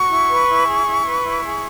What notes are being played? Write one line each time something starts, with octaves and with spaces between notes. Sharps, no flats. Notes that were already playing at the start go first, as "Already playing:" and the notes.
Already playing: F#4 C#6
E4
B4
E4
G#4
E4
B4
E4
G#4